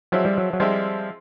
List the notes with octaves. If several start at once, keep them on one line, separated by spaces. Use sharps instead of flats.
F3 F#3 G#3 C4 E4
G3
F#3
F#3
F3 G3 G#3 C4 E4